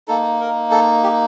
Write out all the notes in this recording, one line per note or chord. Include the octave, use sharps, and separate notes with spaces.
A#3 D#4 A4
A#4
A4
G4